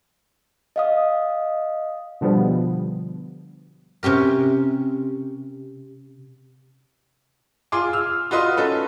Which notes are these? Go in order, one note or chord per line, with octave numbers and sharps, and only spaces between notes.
D#5 F5 D#6
B2 D3 F3 G3 B3
C3 C#4 G4 A#4
F4 G#4 C6 D6
E6 F6
F4 F#4 B4 D#5 C6 D#6
C#4 D#4 A4 B4